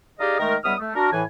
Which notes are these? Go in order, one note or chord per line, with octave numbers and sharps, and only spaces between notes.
D#4 G4 G#4 D5 D#5 F5
D#3 G#3 A3 A#4
C#2 G3 B3 E5 D#6 F6
A3
D4 F#4 A#4
A2 E3 G#5